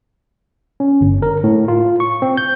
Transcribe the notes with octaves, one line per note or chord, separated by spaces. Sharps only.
C#4
G1
A#4
A2
F4
C#6
C4
G6